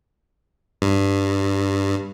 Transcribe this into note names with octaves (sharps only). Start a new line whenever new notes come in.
G2